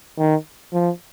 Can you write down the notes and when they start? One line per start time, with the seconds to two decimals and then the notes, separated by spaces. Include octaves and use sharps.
0.19 D#3
0.73 F3